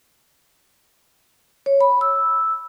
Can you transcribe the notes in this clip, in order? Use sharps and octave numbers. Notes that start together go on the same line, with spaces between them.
C#5
B5
E6